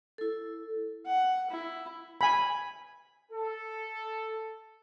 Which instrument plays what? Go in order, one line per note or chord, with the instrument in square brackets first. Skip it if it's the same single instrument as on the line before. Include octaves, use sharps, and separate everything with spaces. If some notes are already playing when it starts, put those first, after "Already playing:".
[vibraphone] E4 A4
[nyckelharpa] F#5
E4
[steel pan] G#5 B5
[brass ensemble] A4